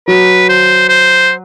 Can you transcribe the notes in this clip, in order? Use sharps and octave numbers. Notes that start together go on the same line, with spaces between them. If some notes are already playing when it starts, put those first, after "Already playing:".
F#3 B4
C5
C5